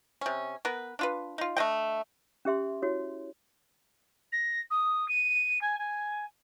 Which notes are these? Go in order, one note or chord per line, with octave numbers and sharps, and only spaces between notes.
C3 C#4
B3 A#4 B4
D4 F4 B4
D#4 F4
A3 D4 D#5 G5
C#4 G4 E5 C6
E4 F#4 C#5
A#6
D#6
D#7
G#5
G#5